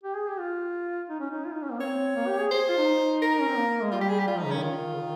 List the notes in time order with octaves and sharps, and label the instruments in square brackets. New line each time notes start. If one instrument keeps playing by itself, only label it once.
[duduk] G4
G#4
G4
F4
D#4
C#4
D#4
F4
D#4
C#4
A#3
[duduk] C4 [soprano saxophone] C#5
[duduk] A#3
G4
G#4
[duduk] G#4 [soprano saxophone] C5
[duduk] F4
D#4
[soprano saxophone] A#4
[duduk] C#4
C4
A#3
G#3
[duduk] G3 [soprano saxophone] F4
[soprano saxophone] G4
G#4
G4
[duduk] G3 [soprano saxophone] F4
[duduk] F3 [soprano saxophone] D#4
[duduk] C#3
[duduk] D#3 [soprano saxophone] C#4
[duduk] D#3 [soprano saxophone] F4
[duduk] C#3
D#3